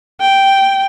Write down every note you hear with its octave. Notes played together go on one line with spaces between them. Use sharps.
G5